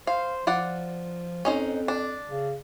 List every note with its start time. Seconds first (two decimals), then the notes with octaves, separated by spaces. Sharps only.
0.07 C5 F5
0.47 F3 F4 D5 F#5
1.45 F2 C#4 D#4 C5
1.88 D4
2.29 C#3